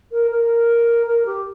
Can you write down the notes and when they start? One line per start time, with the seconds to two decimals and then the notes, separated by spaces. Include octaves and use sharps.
0.11 A#4
0.30 A#4
1.06 A#4
1.25 G4